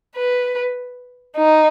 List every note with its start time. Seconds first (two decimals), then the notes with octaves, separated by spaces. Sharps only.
0.16 B4
1.37 D#4